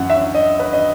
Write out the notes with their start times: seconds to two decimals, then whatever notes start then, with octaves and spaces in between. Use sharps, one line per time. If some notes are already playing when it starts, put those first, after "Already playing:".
Already playing: F#2 E3 F#5
0.10 E5
0.34 D#5
0.59 B4
0.73 D#5